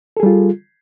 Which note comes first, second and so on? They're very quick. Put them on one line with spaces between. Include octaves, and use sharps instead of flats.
A4 G#4 G3 F4